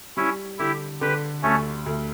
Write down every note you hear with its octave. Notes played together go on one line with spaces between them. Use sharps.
G3 C#4 E4
D3 E4 G4
D3 G4 B4
D2 A3 C#4
D2